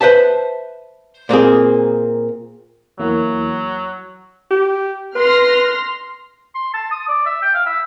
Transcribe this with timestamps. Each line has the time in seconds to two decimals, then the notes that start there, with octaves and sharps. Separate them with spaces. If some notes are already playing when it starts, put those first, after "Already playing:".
0.01 B4 C5 E5 A5
1.29 A#2 A#3 C4 G#4
2.99 E2 F#3 A#3 E4
4.51 G4
5.15 B4 C6 F6 A#6
6.55 C6
6.74 A5
6.91 D#6
7.08 D5
7.26 E5
7.42 G5
7.54 F5
7.66 E5